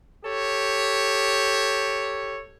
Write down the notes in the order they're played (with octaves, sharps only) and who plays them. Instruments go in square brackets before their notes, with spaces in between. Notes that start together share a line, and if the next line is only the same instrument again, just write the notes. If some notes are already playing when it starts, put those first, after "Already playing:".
[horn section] G4 A4 C#5